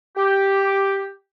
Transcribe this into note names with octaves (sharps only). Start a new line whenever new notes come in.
G4